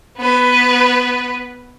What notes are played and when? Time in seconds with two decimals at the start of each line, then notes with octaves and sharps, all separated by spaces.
0.18 B3 B4